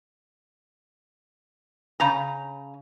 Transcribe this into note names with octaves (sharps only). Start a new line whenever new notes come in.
C#3 A#5